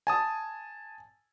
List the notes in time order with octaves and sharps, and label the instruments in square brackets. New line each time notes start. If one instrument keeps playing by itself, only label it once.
[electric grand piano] G#5 A5 D#6